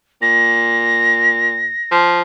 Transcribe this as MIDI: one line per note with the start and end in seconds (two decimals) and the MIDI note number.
0.22 1.73 46
0.22 1.90 94
1.92 2.22 53